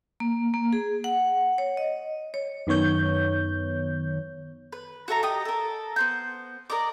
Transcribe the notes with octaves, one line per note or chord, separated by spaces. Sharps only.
A#3
A#3
G#4
F#5
C#5
D#5
C#5
F#2 D#3 B3 C#5 G6
B4
F#4 A4 E5 A#5
G4 D#5 D#6
A4 A#4
B3 C5 G6
A#4 D5 D#5 D6